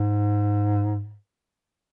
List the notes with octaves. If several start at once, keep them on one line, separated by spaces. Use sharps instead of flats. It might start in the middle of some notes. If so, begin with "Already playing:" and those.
Already playing: G#2